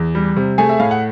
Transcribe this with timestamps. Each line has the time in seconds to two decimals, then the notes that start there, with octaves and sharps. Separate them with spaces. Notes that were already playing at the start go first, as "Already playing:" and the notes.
Already playing: E2
0.15 G3
0.37 C3
0.58 A3 G#4 G#5
0.69 E5
0.79 A2 F5
0.91 F#5